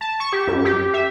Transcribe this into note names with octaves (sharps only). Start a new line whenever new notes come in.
A5
C#6
G4
F#2
G4
E5